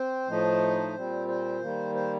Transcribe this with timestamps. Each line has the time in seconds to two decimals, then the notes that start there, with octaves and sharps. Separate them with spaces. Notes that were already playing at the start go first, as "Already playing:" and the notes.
Already playing: C4 C5
0.28 A2 F3 A3 D#4
0.95 A#2 G3 C4
1.28 C5
1.61 D#3 G3 A#3
1.95 C5